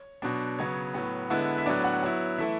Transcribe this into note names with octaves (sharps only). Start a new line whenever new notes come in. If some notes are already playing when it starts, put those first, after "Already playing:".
Already playing: C#5
B2 F#3 B3 D4
C#3 F#3 B3 C#5
A2 F#3 B3
D3 G#3 B3 E4
E5
A2 F#3 B3 D4 D5
F#5
F#3 B3 E4
E3 A3 E4 E5